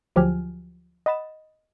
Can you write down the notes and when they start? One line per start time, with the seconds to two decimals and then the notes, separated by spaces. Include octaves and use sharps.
0.16 D2 F3 F#3 G4 G#5 F6
1.06 D#5 F#5 B5 A6 E7